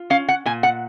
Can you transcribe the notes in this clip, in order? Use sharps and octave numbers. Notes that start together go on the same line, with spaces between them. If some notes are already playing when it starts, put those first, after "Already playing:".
Already playing: F4
C#4 F5
F#5
A#2 G#5
F#5